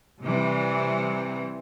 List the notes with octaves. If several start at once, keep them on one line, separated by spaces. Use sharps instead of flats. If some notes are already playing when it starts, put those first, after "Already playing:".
C3 E3 G3